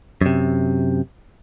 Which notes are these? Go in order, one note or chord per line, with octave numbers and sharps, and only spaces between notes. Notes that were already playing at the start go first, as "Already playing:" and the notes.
F#2 C3